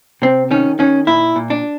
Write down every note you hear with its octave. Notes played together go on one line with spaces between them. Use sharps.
C3 C4
D#3 C#4
D#3 C#4
A#2 E4
A#2
D4